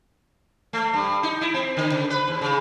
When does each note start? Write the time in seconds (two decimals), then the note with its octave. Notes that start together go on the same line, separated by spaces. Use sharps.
0.73 A3
0.94 G2
1.23 D#4
1.41 E4
1.54 C4
1.77 D3
1.92 C#3
2.10 B4
2.28 D#2
2.41 C#3